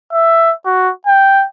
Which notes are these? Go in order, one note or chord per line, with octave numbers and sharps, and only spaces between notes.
E5
F#4
G5